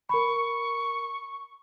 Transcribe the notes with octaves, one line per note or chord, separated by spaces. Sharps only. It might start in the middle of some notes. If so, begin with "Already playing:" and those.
A#4 B5 C#6